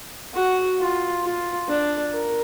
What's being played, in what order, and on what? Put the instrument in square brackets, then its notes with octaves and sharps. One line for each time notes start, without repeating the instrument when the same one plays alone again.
[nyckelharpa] F#4
F4
F4
D4
A#4